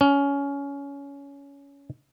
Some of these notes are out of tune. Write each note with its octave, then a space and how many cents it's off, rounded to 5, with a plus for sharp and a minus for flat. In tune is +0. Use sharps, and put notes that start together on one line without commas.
C#4 +20